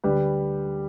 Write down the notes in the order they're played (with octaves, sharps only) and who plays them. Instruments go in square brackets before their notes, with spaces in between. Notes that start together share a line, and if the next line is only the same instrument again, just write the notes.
[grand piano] D2 D3 G3 G4 B4